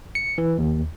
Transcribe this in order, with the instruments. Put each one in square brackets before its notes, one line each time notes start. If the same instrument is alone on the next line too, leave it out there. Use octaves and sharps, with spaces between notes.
[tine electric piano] C#7
E3
D#2